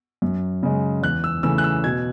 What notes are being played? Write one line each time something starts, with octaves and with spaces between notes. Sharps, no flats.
F#2
C#3 G#3
E2 F#6
E6
C#3 E3 A3 E6
F#6
E6
B2 G#6